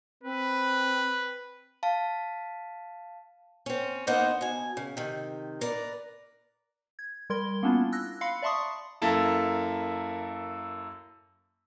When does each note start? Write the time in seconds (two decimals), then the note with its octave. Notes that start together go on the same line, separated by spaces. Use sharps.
0.23 C4 B4
1.83 F5 A5
3.66 C4 C#4
4.07 A#3 B3 D#4 C5 F#5
4.41 B2 G#5
4.77 C#3
4.97 C3 D#3
5.61 A#4 B4 D5
6.99 G#6
7.30 G3 A#4 C6 G#6 G7
7.63 A#3 B3 C#4 D4 E4 F4
7.92 E6 F#6 A#6
8.21 F5 B5 C6 C7 C#7
8.42 D5 E5 A5 C6 C#6 D#6
9.02 F#2 A#3 E4 A4 A5